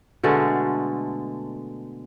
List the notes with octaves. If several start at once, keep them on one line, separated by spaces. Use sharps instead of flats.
B2 D3 G#3 A3